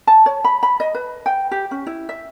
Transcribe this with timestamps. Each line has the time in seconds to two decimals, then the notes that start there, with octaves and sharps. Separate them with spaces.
0.07 A5
0.26 C#5
0.44 B5
0.63 B5
0.80 D#5
0.95 B4
1.26 G5
1.51 G4
1.71 C#4
1.86 E4
2.09 E5